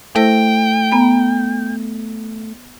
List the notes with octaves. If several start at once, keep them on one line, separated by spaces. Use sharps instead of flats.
A3 E4 C5 G5 A#6
B3 A#5 B5